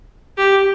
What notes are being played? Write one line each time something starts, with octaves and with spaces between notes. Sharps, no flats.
G4